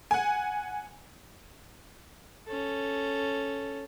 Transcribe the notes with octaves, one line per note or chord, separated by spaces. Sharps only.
F#5 G#5
C#4 A4